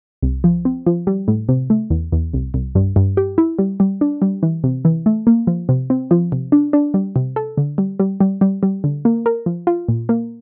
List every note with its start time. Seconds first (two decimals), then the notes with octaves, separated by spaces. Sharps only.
0.23 C2
0.44 F3
0.65 C4
0.87 F3
1.07 G3
1.28 A2
1.49 C3
1.70 A3
1.90 E2
2.12 E2
2.33 C2
2.54 C2
2.75 G2
2.96 G2
3.17 G4
3.38 E4
3.59 G3
3.80 G3
4.01 D4
4.22 G3
4.43 E3
4.64 C3
4.85 E3
5.06 A3
5.27 A#3
5.47 F3
5.69 C3
5.90 C4
6.11 F3
6.32 C3
6.52 D4
6.73 D4
6.94 G3
7.16 C3
7.36 A4
7.57 D3
7.78 G3
8.00 G3
8.20 G3
8.41 G3
8.63 G3
8.84 D3
9.05 A#3
9.26 A#4
9.46 F3
9.67 F4
9.88 A#2
10.09 A#3